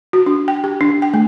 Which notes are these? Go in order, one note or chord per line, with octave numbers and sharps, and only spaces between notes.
F#4
D4
G5
G4
D4
G5
A3